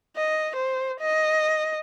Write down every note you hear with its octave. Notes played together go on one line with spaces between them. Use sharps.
D#5
C5
D#5